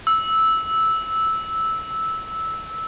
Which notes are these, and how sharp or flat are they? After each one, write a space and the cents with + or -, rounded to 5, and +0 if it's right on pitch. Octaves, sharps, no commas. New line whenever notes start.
E6 -10